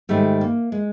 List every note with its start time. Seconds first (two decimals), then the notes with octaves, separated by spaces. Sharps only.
0.09 G#2 D#3 G3 A3
0.41 A#3
0.72 G#3